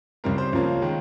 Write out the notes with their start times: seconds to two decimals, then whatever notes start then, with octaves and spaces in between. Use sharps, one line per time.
0.24 C#2 C#3 G3 C4 A#4
0.38 C5
0.53 C#2 C#3 F3 A#3 C#4
0.82 D#3 G#3